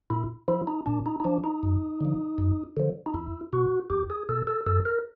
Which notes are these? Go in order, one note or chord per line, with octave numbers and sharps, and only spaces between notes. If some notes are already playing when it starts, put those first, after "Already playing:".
A#2 E4
F3 E4
D#4
A#2 D4
D#4
D#4
F3 D4
D#4
F#2
D3 F3
F#2
D3 F3
D#4
E2 E4
B2 F#4
E2 G4
G#4
B2 A4
A4
F#2 A4
A#4